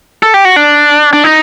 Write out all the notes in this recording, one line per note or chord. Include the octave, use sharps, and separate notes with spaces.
A4
G4
F#4
D4
D4
D#4